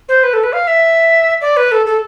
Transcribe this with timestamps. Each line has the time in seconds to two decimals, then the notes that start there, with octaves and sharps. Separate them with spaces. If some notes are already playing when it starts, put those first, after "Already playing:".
0.09 C5
0.23 B4
0.33 A4
0.43 B4
0.53 F5
0.67 E5
1.41 D5
1.57 B4
1.72 A4
1.86 A4